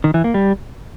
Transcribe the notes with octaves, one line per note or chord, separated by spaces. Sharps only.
D#3
E3
A#3
G3